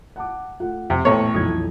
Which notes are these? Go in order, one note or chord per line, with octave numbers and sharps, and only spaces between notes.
F#5 A5 D6
A3 F4 F#5
F2 C3
A1 A#2 A3 B3 A4 C5 C#5 G5
B1 F2 E3 D#6 G#6